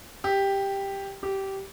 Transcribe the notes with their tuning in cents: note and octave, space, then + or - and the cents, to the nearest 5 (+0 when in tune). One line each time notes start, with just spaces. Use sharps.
G4 +5
G4 -15